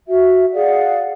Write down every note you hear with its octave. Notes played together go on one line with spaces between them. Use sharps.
F#4 E5
G#4 D5 F5 F#5